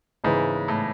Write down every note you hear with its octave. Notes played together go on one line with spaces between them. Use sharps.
G#2 C#3 E3 G#3 B3 E4
A2